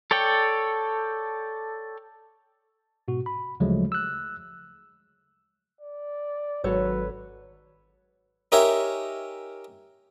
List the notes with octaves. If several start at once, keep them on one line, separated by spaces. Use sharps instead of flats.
A4 C#5 D5 G5
G#2 B2 F#4
B5
D2 C#3 F3 F#3 G#3 A3
E6 F#6
D5
G#1 F#3 A4 B4 C#5
D#4 G4 A#4 C#5 E5 G#5